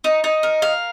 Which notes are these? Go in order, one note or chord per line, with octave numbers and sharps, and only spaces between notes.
D#4
D#4
A#4
F5